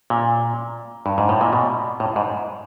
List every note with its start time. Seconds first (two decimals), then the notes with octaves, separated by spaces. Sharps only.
0.10 A#2
1.06 G2
1.18 G#2
1.29 A2
1.41 A#2
1.53 B2
2.00 A2
2.16 G#2